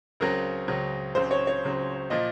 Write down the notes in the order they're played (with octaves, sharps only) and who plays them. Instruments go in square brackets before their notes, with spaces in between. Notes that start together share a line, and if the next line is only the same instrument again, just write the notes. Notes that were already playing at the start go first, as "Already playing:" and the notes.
[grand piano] C#2 C#3 F#3 C4 [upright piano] A#4
[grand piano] C#2 C#3 F#3 C4
[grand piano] C#2 C#3 F#3 C4 [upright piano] C5
[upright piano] C#5
C#5
[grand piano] C#2 C#3 F#3 C4
[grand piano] A#2 F3 [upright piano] D#5